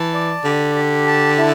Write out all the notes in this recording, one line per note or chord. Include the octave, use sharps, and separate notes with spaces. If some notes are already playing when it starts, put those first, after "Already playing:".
Already playing: E3 A5
D5
D3 G4
G4
A5
E4